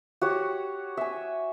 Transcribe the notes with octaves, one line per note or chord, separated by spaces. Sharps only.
F#4 G4 C#5
E5 G#5